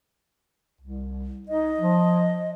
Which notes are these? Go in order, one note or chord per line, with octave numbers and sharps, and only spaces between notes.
C2
D#4 D#5
F3